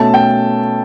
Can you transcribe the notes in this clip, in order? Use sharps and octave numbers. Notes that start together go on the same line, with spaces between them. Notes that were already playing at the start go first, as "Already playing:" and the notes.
Already playing: B2 A3 C#4 A5
G5